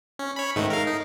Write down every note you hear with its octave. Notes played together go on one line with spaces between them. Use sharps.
C#4
C#5 B5
G#2 D#3 A3
A#4 F5
D#4